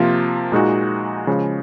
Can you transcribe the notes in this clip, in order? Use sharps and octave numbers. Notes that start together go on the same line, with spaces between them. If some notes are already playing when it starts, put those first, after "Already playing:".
Already playing: C3 F3 A#3 F4
A#2 G#3 D#4 F#4
C#3 F3 G#3